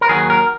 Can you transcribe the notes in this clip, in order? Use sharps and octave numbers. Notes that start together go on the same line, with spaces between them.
A#4
D#2 D#3 F#3 G#4
A#4